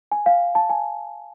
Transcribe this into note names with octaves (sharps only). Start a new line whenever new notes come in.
G#5
F5
A5
G#5